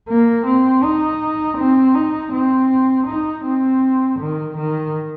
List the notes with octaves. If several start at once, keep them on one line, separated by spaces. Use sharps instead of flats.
A#3
C4
D#4
C4
D#4
C4
D#4
C4
D#3
D#3